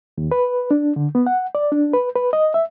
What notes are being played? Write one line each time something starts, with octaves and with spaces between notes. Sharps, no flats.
D#2
B4
D4
D3
B3
F#5
D5
D4
B4
B4
D#5
E5